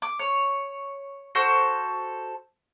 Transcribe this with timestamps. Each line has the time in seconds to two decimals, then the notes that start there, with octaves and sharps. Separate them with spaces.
0.02 D6
0.19 C#5
1.35 F#4 A4 C5